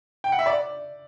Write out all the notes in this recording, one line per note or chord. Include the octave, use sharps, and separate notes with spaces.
G5
F#5
E5
D5